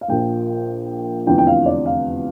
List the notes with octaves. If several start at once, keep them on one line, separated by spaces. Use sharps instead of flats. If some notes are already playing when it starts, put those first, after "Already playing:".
F5
A#1 A#2 F3 G5
F1 E2 D3 F3 G5
G5
F5
D5
F5